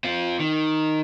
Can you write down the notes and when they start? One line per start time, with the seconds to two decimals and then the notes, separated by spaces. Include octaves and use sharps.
0.04 C4 F4
0.39 D#3